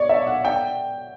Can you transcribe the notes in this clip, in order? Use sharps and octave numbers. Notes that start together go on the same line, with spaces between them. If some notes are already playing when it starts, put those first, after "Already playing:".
Already playing: C#5 D5
E5
F#5
G5